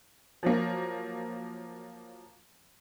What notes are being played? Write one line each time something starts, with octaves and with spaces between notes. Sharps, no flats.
F3 F#3 A#3